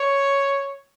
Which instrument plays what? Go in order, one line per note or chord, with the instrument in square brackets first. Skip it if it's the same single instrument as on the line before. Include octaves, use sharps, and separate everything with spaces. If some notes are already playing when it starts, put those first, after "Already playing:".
Already playing: [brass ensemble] C#5